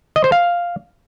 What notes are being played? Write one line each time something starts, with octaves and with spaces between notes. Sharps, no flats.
D#5
C5
F5